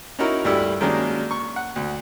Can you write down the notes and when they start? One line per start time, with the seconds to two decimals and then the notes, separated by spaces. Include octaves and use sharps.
0.19 C#4 D#4 E4 F#4 A#4 C#5
0.44 D2 G2 D3 E4 G4 E6
0.81 D#3 F#3 G#3 A#3 C#4 D4
1.31 C#6
1.56 F#5
1.76 D2